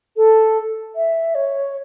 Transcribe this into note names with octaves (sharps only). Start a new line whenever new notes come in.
A4
E5
C#5